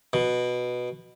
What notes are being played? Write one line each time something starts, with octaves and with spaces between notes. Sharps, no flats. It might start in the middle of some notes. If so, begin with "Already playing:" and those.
B2